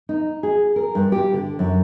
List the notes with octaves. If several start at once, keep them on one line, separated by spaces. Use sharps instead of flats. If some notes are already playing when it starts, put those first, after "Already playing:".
D#4
G#4
A#4
G2
G4
D3
F#2